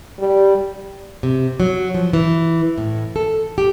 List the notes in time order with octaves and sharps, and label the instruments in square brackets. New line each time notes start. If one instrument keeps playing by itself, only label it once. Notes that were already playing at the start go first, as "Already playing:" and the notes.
[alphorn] G3
[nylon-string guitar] C3
F#3
F3
E3
A2
A4
G4